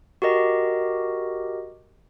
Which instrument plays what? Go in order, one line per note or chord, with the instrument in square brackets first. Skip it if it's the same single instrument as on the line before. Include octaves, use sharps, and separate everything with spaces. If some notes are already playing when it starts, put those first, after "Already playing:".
[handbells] F#4 G4 A#4 D#5